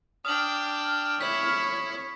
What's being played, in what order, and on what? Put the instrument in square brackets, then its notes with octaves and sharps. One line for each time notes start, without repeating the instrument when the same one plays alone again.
[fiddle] D4 G5 [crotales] D#6 F#7 [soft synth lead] F6
[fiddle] E4 [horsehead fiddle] C#5 [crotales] B6